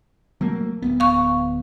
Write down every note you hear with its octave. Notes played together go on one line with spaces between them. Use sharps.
F#3 A3 A#3
D1 G#1 B3
F5 C#6